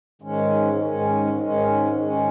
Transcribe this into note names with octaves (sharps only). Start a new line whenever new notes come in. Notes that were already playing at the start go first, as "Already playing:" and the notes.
G#2 D#3 G#3 C#4
G#2 D#3 G#3 C#4
G#2 D#3 G#3 C#4
G#2 D#3 G#3 C#4